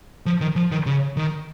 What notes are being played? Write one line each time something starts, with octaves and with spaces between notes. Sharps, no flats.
F3
D#3
F3
D#3
C#3
D#3